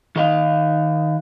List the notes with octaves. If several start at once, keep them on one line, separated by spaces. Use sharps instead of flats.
D#3 D#5 F5